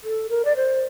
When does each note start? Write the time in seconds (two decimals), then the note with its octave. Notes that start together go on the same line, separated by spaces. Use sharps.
0.04 A4
0.29 A#4
0.45 D5
0.56 C5